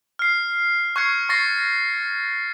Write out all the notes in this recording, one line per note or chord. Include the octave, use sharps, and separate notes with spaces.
F6 C7
C#6 F#6 G#6 C7 C#7
C#6 A6 A#6 C7